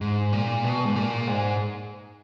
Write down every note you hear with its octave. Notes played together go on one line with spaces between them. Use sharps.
G#2
A#2
B2
G#2
A#2
G#2